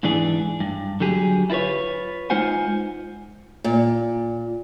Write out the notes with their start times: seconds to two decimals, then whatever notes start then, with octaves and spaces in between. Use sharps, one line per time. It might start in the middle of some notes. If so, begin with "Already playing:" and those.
0.03 G#2 E3 D4 G#4
0.60 G2
1.00 D3 F#3 G4 G#4
1.50 E4 F4 A#4 B4 C#5
2.30 G#3 D#4 F4 C5 F#5 G#5
3.64 A#2